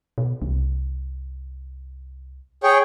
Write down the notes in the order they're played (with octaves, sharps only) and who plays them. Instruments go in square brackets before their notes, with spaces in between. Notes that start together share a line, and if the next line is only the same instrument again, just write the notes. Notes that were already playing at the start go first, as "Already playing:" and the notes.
[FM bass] B2
C2
[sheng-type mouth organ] G#4 C#5 G5